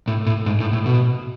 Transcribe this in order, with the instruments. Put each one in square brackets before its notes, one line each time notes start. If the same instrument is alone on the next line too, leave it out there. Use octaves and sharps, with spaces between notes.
[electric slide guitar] A2
A2
G#2
A2
A2
B2